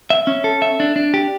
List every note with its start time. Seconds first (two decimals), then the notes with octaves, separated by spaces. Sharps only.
0.10 E5
0.27 C#4
0.44 A4
0.62 E5
0.80 D4
0.96 D4
1.14 G4